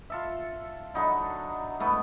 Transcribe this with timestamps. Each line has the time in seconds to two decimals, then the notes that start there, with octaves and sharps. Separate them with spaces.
0.10 F4 A4 E5
0.94 D3 F#3 D#4 E4
1.80 G#2 A3 B3 E4